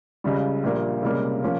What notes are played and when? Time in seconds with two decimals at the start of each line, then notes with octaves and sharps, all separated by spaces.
0.24 C#2 C#3 G3
0.63 A#1 A#2 G3 A#3
1.02 C#2 C3 G3 A#3 C#4
1.43 F3 A#3 C#4